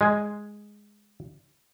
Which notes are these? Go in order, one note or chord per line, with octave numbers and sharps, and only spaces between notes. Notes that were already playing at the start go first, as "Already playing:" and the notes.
G#3 G#5